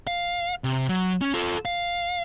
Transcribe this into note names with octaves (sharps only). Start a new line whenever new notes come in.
F5
C3
F#3
C#4
F4 A4
F5